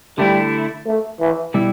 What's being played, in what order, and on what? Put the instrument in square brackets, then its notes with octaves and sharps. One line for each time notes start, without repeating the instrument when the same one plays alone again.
[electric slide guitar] D3 A3 E4 [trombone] G3
[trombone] A3
E3
[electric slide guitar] B2 G3 E4